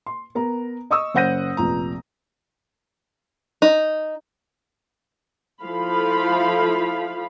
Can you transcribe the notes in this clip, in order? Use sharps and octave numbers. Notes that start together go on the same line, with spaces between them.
C6
B3 A#4 A#5
D#5 C#6 D#6 E6
F#1 C5 F#5 G6 A#6 D#7
F1 A#1 A#5
D#4
F3 E4 F4 A4 F5 B5